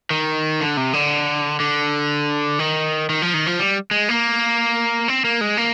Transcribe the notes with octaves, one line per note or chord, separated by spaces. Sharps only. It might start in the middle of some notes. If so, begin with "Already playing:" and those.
D#3
D3
C3
D3
D3
D#3
D#3
F3
D#3
F3
G3
G#3
A#3
C4
A#3
G#3
A#3